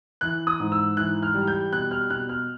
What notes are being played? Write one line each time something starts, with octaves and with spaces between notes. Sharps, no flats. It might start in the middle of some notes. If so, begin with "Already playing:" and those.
E3 F#6
D#6
G#2
E6
E3 F#6
F6
G3
G6
B2 F#6
F6
B2 F#6
F6